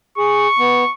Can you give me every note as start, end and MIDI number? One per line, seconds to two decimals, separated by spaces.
0.18 0.47 68
0.18 0.93 85
0.59 0.84 59